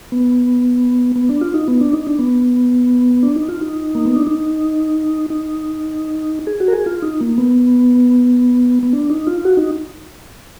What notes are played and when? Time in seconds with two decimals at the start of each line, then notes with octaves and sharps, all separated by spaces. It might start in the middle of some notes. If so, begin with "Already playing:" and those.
0.12 B3
1.16 B3
1.29 D4
1.41 F4
1.54 D#4
1.68 B3
1.81 D4
1.93 D#4
2.07 D4
2.19 B3
3.23 D4
3.36 D#4
3.49 F4
3.61 D#4
3.95 A#3
4.05 B3
4.16 D4
4.27 D#4
5.30 D#4
6.47 G#4
6.60 F#4
6.68 A#4
6.73 G#4
6.86 F4
7.02 D#4
7.21 A#3
7.38 B3
8.83 B3
8.93 D4
9.10 D#4
9.27 F4
9.45 F#4
9.57 D#4